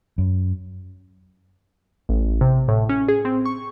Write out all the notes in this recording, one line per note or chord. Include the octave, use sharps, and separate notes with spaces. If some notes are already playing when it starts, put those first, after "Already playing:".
F#2
A1
C3
A2
C#4
G#4
C4
C#6